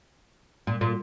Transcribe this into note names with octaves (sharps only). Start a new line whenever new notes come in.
A#2
A#2